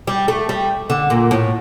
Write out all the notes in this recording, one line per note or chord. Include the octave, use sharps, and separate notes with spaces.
G3
A3
G3
D3
A#2
A2